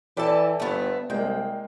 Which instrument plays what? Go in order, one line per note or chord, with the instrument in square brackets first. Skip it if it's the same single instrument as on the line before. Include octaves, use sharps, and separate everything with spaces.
[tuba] E3 [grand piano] A4 G5 B5 [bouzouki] D5 A5
[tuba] G1 [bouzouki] A3 B3
[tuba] C2 [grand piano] G#3 A#3 [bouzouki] G5